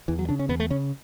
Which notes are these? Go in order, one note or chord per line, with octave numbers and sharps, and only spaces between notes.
E2 E3
F#3
C#3 D4
C#4
E2 B3
A3
C#3 C#4